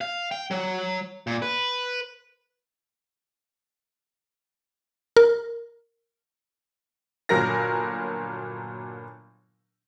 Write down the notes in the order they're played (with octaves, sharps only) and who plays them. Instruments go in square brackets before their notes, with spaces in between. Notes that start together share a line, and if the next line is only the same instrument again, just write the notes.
[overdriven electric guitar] F5
G5
F#3
A#2
B4
[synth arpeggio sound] A#4
[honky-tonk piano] G1 A#2 F#3 A#4 A#6